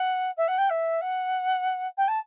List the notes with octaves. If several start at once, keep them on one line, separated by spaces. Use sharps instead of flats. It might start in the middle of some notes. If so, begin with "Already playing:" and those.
Already playing: F#5
E5
F#5
G5
E5
F#5
G5
A5